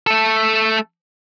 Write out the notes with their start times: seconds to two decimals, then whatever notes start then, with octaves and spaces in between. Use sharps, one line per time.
0.07 A3 A4